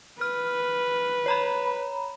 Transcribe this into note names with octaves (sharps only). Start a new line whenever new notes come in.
B4 F6
C#5 A#5 B5